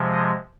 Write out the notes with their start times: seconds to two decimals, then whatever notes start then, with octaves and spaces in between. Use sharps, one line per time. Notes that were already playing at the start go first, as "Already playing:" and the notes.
Already playing: C3 F3 G#3
0.12 D#5